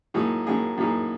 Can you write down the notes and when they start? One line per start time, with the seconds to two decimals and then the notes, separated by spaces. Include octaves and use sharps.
0.14 A2 F#3 A#3 D#4 G#4
0.47 A2 F#3 A#3 D#4 G#4
0.78 A2 F#3 A#3 D#4 G#4